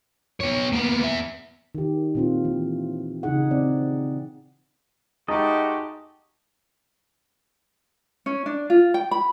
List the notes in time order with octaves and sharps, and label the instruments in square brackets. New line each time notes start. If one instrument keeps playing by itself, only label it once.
[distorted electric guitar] B3 C#5
A#3 B3
B3 E5
[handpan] D#3 G4
A#2 C4 F4
E3
C#3 D#4 G#4 F#5
C4 D5
[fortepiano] G#3 D#4 [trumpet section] A3 F#4 G4 [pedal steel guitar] D#5 A5
[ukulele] C#4
D4
F4
G5
B5